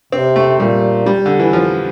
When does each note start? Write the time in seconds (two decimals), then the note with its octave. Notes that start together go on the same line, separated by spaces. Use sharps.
0.12 C3 C4
0.36 A3
0.60 A#2 G3
1.06 G3
1.26 D3
1.40 E3
1.53 F3